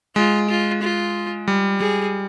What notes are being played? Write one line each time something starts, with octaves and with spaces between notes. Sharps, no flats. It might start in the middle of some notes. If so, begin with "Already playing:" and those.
G#3 F4
F4
F4
G3
G3 G#4